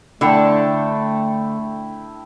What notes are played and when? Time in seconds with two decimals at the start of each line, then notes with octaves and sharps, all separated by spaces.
0.21 D3 A3 E4 G5 A5